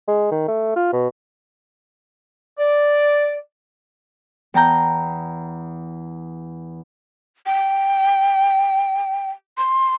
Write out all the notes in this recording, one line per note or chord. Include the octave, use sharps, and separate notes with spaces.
G#3
D#3
A3
F4
B2
D5
E2 G5 A5 A#5 G6
G5
C6